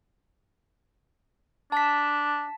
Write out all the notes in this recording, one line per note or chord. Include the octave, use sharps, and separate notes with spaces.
D4 A5 B6